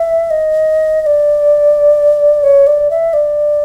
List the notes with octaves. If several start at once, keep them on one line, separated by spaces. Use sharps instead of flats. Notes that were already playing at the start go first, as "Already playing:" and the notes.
Already playing: E5
D#5
D#5
D5
C#5
D5
E5
D5